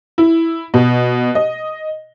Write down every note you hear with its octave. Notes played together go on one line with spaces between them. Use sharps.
E4
B2
D#5